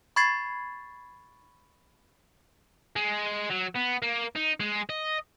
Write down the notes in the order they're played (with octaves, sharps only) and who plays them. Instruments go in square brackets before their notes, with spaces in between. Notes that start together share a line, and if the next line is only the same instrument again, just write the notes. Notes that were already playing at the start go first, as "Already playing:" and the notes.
[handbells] B5 C#6 G#6 A6 C7
[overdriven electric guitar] G#3
F#3
B3
A#3
D#4
G#3
D#5